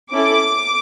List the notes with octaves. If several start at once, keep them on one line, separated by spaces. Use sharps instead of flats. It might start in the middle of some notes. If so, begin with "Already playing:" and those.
C#4 E4 A4 D6